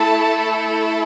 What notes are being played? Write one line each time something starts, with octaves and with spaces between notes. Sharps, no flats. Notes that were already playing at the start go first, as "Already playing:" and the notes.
Already playing: A3 E4 A4 A5